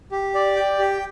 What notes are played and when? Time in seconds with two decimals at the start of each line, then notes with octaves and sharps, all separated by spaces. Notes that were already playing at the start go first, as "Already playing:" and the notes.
0.12 G4
0.34 D5
0.56 G5
0.79 G4